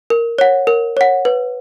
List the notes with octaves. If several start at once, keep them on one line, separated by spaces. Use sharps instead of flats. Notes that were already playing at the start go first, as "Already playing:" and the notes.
A#4
C#5 F#5
A#4
C#5 F#5
B4